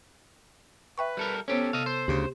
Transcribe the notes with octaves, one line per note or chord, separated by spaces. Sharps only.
B4 E5 G5 C#6
G3 A4 A#4
B3 C#4 G4 A4 C5 C#5
C3 D#5 F5
C5
D2 C#3 G4